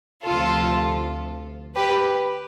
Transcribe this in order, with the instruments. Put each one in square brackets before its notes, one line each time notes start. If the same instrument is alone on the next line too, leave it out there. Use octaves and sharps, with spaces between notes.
[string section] D2 C3 F3 F4 A4
G4 B4